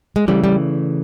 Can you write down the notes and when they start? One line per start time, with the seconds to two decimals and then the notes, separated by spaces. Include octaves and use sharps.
0.16 G#3
0.28 C#3 E3 G3 A3
0.44 G3